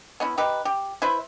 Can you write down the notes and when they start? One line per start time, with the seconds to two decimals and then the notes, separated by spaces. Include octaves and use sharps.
0.20 B3 C#4 E4
0.38 D#4 G4 B4
0.65 G4
1.02 E4 B4 C5 E5